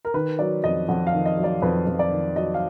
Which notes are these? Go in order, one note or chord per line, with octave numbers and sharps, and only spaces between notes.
A#4
D#3 B4
F#3 D5
F2 D#5
F2 F#5
F5
D#3
D#5
F#3
D5
F2 B4
F2
D5
D#3
F#3 D#5
F5